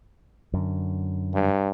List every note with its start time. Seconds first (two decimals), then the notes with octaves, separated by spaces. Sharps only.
0.53 F#2 D3
1.35 G2